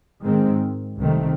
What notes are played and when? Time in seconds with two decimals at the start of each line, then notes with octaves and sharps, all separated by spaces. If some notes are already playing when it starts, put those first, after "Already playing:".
0.24 G#2 D#3 G#3 C4
0.99 C2 C3 D#3 A3 C4